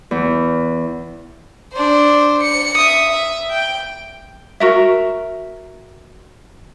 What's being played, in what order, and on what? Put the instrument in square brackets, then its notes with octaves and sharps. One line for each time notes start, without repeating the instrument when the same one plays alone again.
[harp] E2
[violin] D4 C5
C#7
E5 D#6
E5
G5
[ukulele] F#4 A#4 E5